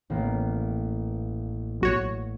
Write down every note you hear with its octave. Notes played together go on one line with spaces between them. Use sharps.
A1 A#3 B3
B1 F#4 C#5